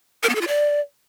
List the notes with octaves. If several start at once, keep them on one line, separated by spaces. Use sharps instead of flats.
A#4
B3
A4
F4
D5